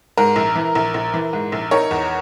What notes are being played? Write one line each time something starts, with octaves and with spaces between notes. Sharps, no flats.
G#2 A#4
A#1
E3
A#1
A#1
E3
G#2
A#1
D#4 A#4 C#5
E2